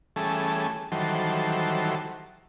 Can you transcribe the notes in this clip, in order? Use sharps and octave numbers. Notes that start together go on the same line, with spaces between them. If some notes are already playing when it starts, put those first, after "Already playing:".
E3 G3 A3 C#4 G#4 A4
D#3 E3 F#3 G3 A4 C5